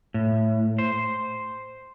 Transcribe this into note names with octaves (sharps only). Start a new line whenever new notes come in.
A2
C5